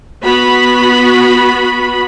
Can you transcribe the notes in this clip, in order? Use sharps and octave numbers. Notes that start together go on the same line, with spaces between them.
B3 F#4 B5